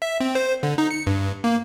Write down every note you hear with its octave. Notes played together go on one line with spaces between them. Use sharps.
E5
C4
C5
D3
D#4
C#7
G2
A#3